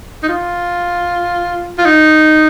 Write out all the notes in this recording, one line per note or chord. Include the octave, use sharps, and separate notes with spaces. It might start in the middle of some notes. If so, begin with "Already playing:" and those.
D#4
F4
F4
D#4